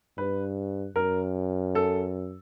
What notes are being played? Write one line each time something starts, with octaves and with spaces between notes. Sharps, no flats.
G2 B4
F#2 A#4
A4